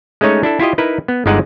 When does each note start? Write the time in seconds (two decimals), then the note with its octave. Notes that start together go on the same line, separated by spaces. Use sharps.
0.21 G#3 A3 C#4 D#4 C#5
0.43 D4 E4 A4
0.59 E4 F4 G4 D#5
0.78 D#4 E4 A#4 B4
1.08 B3
1.26 G1 D3 G#3 D#4 D5 F#5